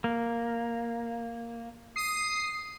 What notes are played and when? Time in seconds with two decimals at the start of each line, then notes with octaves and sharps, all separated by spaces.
0.04 A#3
1.96 D#6 C7